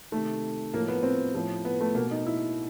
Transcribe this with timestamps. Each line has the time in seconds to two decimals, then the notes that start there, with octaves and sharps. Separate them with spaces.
0.12 C3 D#3 A3
0.73 A2 F3 A#3
0.88 B3
1.03 C4
1.34 A2 F3
1.65 B3
1.80 A3
1.95 B2 A#3
2.11 D#4
2.26 E4